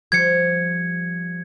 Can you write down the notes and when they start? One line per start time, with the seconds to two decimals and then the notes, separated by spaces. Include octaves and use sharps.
0.12 F3 G3 C5 G#6 C#7